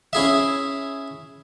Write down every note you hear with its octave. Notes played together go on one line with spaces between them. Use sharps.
C#4 E4 G#4 E5